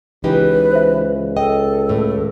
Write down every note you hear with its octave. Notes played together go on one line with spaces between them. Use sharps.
C#2 E3 D#4 G4 B4
C5 E5
A4 D#5 G5
D#2 A2